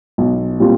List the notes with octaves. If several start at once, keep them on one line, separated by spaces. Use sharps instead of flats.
B1
A#2 G3 C4 F4